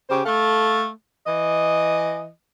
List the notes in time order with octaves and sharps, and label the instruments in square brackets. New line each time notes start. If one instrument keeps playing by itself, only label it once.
[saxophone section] C#3 G4 C5
A3 A4 F5
E3 D#5